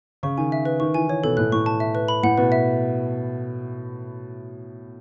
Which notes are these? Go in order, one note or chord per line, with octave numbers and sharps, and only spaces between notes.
C#3 C#6
D#3 G#5
E5
B4
D#3 C#6
E3 G#5
D#3 C#5
B2 A4
A2 F#6
A2 C#6
A5
E5
B4
B5
A2 F#5
B2 B4
E5